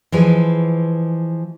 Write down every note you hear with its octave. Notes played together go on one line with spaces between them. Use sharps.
E3 F3 G#3 B4